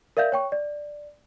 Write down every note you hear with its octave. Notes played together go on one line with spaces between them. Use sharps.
A#4 D5 E5 F5 G6
C#5 G5 C#6
D5